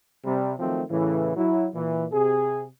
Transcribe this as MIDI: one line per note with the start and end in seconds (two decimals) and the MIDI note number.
0.25 0.53 48
0.25 0.53 55
0.59 0.83 51
0.59 0.83 53
0.59 0.83 54
0.59 0.83 57
0.59 0.83 60
0.90 1.34 45
0.90 1.34 49
0.90 1.34 52
1.37 1.68 54
1.37 1.68 64
1.75 2.06 46
1.75 2.06 52
2.13 2.66 48
2.13 2.66 68